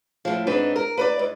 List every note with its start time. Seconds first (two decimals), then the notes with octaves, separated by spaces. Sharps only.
0.25 A2 F3
0.47 G#2 C4 D4 D#4 B4
0.76 A#4
0.98 B4 C5 D5
1.19 G#2